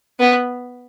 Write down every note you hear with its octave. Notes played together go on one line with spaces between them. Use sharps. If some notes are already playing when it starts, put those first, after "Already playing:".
B3